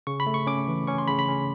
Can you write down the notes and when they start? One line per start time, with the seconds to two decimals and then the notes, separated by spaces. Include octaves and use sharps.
0.07 C#3 C#6
0.20 B5
0.26 A3
0.34 C#6
0.47 C#4 D6
0.68 E3
0.87 C#4 C#6
0.98 C6
1.07 C#3 B5
1.19 B5
1.28 C#4